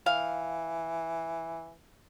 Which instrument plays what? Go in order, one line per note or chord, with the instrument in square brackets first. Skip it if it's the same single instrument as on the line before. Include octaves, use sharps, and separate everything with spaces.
[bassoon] E3 [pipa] F5